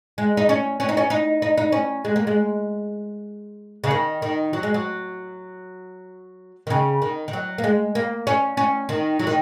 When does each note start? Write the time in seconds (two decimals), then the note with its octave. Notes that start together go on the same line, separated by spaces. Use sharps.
0.18 G#3
0.37 D#4
0.49 C#4
0.80 C#4
0.89 D#4
0.97 C#4
1.10 D#4
1.42 D#4
1.57 D#4
1.72 C#4
2.05 G#3
2.16 A#3
2.27 G#3
3.84 C#3
3.91 D#3
4.22 D#3
4.53 F#3
4.63 G#3
4.74 F#3
6.67 D#3
6.70 C#3
7.02 D#3
7.28 D#3
7.33 F#3
7.58 A#3
7.64 G#3
7.95 A#3
8.27 C#4
8.57 C#4
8.89 D#3
9.19 F#3
9.27 D#3